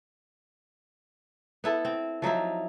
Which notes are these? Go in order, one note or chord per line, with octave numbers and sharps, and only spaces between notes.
B3 E4 A4
C4
F3 F#3 D#4 E4